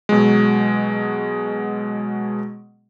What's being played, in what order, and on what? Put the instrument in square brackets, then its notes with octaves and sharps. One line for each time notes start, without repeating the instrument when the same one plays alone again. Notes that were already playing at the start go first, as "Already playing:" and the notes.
[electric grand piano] B2 F#3 G#3